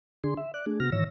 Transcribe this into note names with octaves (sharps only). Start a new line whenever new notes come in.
D3 D4 G#4 C6
E5
D5 F#6
A3 D4 G#4
C3 B3 F#4 F6 A#6
G#2 D#3 E3 C#5 E6 A#6